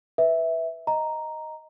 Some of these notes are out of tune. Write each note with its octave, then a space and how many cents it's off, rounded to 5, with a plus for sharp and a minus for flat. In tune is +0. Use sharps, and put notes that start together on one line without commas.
B4 +0 E5 -10
D#5 +0 A#5 +0